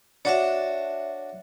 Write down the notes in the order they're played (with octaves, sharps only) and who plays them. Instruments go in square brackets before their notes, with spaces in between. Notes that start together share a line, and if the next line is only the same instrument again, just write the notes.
[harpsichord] D4 F#4 F#5 [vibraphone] C#5 E5